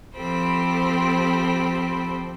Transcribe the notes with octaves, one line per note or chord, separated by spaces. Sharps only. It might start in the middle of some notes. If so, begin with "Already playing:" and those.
F3 C4 G4 A4 C5 B5